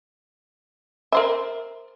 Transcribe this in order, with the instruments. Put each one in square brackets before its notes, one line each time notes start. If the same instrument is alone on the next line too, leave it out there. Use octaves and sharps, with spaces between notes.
[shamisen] A#4 C5 E5